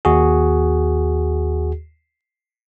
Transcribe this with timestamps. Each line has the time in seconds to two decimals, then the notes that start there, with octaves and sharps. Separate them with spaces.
0.05 D#2 F#4 G#4